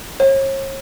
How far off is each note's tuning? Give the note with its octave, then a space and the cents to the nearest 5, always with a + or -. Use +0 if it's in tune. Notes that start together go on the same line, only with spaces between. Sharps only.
C#5 -40